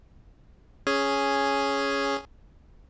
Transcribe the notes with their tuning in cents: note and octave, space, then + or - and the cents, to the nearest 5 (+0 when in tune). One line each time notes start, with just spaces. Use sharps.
C#4 +0 G#4 +0